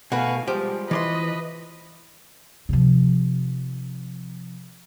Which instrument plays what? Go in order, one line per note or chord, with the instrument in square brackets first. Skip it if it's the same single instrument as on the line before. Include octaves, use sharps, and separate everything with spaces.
[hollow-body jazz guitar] B2 A3 [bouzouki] F#4 B4 [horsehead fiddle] F5 G#5
[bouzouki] F3 [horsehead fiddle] G3 G#3 [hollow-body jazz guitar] G4
[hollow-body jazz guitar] E3 D5 C6 [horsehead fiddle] B4 D#5
[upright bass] C3 F3